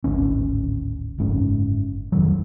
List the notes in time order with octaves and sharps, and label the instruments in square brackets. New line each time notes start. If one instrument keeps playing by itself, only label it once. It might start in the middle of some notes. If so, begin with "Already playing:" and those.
[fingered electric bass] D1 G#1 D2 C#4
F#1 G#2 C#4
F2 D#3 F#3